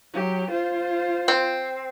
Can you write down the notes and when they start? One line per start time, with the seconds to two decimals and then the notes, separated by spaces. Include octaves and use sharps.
0.14 F#3 G4
0.50 F4 C5
1.28 C4